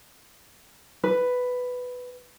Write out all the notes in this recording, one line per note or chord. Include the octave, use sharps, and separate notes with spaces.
B4